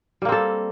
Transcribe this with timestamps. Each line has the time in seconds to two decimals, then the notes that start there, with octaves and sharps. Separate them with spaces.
0.22 G3
0.25 A#3
0.29 C4
0.32 A4